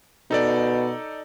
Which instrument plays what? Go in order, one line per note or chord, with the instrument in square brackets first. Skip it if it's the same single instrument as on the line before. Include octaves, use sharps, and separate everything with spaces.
[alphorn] B2 [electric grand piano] D#4 A4 D5